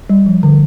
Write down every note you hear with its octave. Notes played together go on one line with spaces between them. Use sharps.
G3
F3
D3